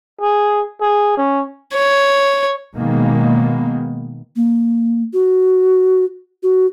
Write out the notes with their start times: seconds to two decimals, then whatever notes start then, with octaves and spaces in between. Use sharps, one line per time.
0.21 G#4
0.81 G#4
1.17 C#4
1.74 C#5
2.76 B2 D#3 G#3 A#3 B3
4.36 A#3
5.13 F#4
6.43 F#4